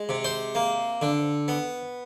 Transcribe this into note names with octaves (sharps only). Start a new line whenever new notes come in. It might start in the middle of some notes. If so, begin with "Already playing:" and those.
Already playing: G#3
C3
C5
A#3
D3
B3